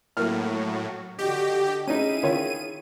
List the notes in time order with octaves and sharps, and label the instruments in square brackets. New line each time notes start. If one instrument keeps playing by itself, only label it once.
[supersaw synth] A2 [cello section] F#3 F#4 [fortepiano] A#3 F6
[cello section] D3 F#4 D#5 [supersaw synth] G4
[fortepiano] C#4 D#4 [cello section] E4 G#4 [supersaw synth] D#7
[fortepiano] D#3 F4 C#5